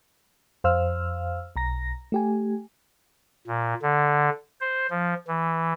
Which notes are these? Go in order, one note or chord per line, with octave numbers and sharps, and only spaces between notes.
F2 C5 F5 E6 F6
B1 A#5 A#6
A3 G4 G#5
A#2
D3
C5
F3
E3